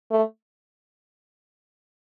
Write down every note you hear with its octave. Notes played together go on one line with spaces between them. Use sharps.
A3